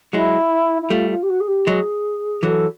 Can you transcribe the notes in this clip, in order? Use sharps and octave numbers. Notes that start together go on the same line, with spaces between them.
F#3 G#3 E4
E4
G3 A3 F4
F4
G4
F#4
G#4
G4
F#3 G#3 G#4
E3 F#3 A4